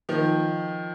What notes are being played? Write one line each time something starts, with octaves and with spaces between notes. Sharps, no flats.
D#3 F3